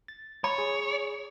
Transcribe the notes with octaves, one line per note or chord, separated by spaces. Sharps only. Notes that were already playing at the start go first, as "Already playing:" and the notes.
A6
C#5 B5
G#4